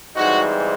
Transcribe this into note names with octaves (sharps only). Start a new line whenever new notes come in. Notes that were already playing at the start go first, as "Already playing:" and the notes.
G#2 E3 G3 C4 D#4 F#4